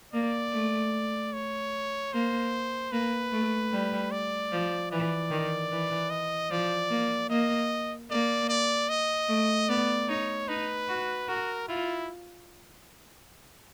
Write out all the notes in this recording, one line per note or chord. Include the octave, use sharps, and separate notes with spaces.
A#3 D5
A3
C#5
A#3 C5
A#3 B4
A3
G3
D5
F3
E3 D5
D#3
E3
D#5
F3 D5
A#3
A#3 D#5
A#3 D5
D5
D#5
A3
B3 D5
D#4 C#5
D#4 B4
F#4
F#4 A#4
E4 F4